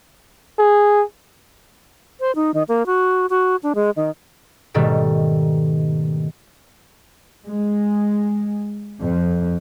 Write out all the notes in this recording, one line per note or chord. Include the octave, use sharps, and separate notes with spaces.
G#4
C5
D#4
D#3
A#3
F#4
F#4
D4
G#3
D#3
G#2 B2 D#3 G3 A3
G#3
F2